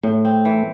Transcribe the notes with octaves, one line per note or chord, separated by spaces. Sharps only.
A2 A3
C4
E3